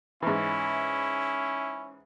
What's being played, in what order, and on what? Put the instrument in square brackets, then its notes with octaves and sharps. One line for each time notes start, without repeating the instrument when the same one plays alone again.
[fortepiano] G#2 E3 [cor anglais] C#4 [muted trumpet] E4